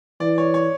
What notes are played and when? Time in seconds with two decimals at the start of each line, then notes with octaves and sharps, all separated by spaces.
0.20 E3 D5
0.38 C#5
0.54 C#5